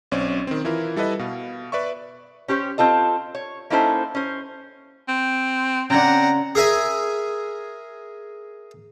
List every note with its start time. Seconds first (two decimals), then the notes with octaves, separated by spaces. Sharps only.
0.11 B1 C4 C#4 D5
0.47 D#3 C4
0.65 E3 E4 F4 A#4
0.96 G3 E4 A4 B4 D#5
1.19 B2 F5
1.72 B4 D5 E5 C#6
2.48 C#4 G4 C5 C#5
2.78 C4 F4 A4 D#5
3.35 C#5
3.70 A#3 C#4 D#4 E4 A4 C5
4.15 C#4 C5
5.08 C4
5.90 C#3 C4 D4 F#5 A#5
6.55 G#4 A#4 E5 G#5